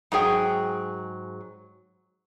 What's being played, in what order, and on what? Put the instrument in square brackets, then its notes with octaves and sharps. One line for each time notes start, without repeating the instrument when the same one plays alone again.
[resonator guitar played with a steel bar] G#2 F#3 G#4 G5